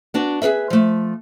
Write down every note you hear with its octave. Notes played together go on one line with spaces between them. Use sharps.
B3 D4 F#4
G#4 A4 B4 E5
F3 A3